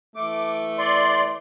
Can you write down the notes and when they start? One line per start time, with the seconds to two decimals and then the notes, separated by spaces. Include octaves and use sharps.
0.15 E3 A3 D6
0.79 D5 C6